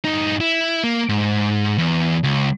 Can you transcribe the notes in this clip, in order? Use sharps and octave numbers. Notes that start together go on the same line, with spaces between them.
G2 D#4
E4
A#3
G#2
E2
C#2